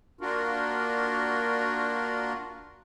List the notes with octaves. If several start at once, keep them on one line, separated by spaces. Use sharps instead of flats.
A#3 D4 F4 F#4 A#4